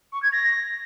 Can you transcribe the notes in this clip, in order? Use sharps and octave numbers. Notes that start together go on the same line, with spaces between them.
C#6
G#6
A#6